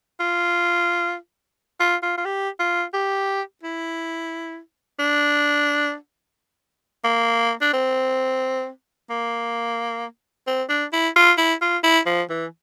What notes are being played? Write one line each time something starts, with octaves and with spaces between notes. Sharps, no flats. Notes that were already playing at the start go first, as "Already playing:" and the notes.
F4
F4
F4
F4
G4
F4
G4
E4
D4
A#3
D4
C4
A#3
C4
D4
E4
F4
E4
F4
E4
F3
E3